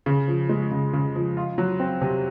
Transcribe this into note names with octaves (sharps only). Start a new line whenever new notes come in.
C#3
F3
G#3
C#3
C#3
F3
F4
F#3
C4
C3